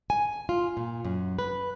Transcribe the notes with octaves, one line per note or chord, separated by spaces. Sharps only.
G#5
F4
A#2
F#2
B4